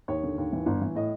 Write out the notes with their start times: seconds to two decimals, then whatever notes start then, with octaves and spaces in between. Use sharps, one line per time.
0.08 D#2 C#5
0.23 D3
0.38 D#2
0.53 E3
0.66 G1
0.81 E3
0.95 A2 D#5